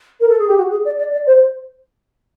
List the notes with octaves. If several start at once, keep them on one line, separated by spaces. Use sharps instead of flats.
A#4
A4
G#4
G4
F#4
G#4
D5
D5
D5
C5